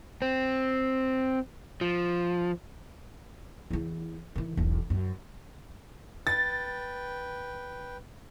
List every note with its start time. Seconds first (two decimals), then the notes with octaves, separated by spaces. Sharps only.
0.22 C4
1.81 F3
3.70 E2 E3
4.36 D#3 E3
4.57 E1 B1
4.90 F#2
6.27 B4 G5 A6